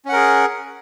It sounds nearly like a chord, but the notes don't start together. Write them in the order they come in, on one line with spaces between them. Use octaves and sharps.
C#4 F#5 A#4 G#4